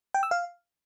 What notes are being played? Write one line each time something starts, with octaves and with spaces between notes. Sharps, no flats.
G5
E6
F5